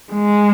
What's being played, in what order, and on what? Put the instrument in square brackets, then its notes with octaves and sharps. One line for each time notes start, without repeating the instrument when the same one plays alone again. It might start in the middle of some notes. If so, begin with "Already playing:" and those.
[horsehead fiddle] G#3